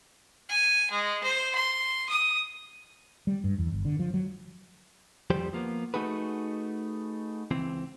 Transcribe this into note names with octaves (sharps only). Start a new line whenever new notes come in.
G#5
G#3
C5
C6
D#6
G3
G2
E2
G1
D3
F3
F#3
F2 F3 G3 G4 C5
F3 A#3 B3
A3 D#4 F#4 G#4 B4
C#2 E3 C4